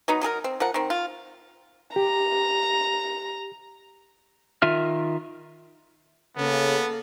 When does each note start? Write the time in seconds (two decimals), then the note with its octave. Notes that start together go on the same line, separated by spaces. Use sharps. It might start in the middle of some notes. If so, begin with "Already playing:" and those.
0.08 F#3 B3 D#4
0.21 F#3 D#4 G#4 A#4
0.44 C4
0.60 F3 A#4 F#5
0.74 D#3 C4
0.90 F4
1.96 G4 A#5
4.62 D#3 F4 E5 F6
6.37 C#3 A#3 B3 A4